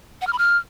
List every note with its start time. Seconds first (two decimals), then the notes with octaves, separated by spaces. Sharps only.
0.21 F#5
0.27 F6
0.33 B5
0.39 F6